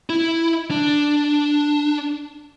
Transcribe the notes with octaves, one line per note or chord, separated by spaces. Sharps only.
E4
D4